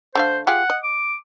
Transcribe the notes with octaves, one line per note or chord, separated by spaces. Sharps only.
D3 A3 C5 F5
F4 G4 G#4 F#5
D#5
D6